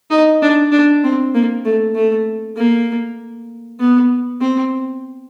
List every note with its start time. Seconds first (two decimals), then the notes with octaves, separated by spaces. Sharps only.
0.11 D#4
0.42 D4
0.72 D4
1.04 C4
1.34 A#3
1.65 A3
1.95 A3
2.57 A#3
3.80 B3
4.41 C4